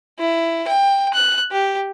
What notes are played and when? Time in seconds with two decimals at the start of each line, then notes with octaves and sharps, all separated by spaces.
0.19 E4
0.68 G5
1.14 F#6
1.52 G4